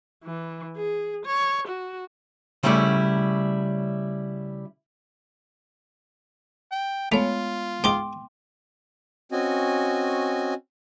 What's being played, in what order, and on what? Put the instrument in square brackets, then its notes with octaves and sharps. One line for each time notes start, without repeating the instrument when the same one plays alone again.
[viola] E3
G#4
C#5
F#4
[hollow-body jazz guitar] C#3 G3 A3 C#4 E4 D5
[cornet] G5
[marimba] G#3 B3 C#5 [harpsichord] A3 [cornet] F4 [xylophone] F7
[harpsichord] G#2 D#4 [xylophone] G5 C6 D6
[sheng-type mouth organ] C4 C#4 F#4 D#5 G#5